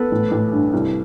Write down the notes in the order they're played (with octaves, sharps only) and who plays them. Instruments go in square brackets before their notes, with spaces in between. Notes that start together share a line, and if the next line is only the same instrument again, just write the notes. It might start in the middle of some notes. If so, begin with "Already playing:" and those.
Already playing: [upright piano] B3 [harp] A4 B4
[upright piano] A1
A1
G2
C2